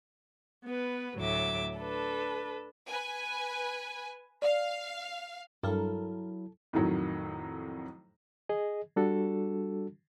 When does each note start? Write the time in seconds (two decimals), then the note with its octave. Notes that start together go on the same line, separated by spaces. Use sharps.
0.65 B3 B4
1.17 D2 A2 F#3 E5 D6
1.77 D4 A4 B4
2.87 B4 G#5
4.42 D5 F5
5.63 G2 F#3 E4 A4 A#4
6.73 F2 A2 D#3 F#3
8.49 G#4 D#5
8.96 G3 D4 F#4 A4